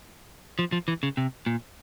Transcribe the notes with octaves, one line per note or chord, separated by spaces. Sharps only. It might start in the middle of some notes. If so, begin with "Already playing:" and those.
F3
F3
E3
C#3
C3
A#2